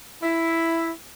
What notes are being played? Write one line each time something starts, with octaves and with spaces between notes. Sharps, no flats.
E4